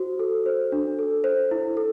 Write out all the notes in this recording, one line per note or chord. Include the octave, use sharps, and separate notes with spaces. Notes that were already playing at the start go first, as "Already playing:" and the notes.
Already playing: F#4 C5
A4
C5
D4
A4
C5
E4
A4